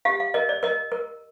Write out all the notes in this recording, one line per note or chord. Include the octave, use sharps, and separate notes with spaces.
G4 F5
F5
A#4 D#5
D5
A#4 D#5
A#4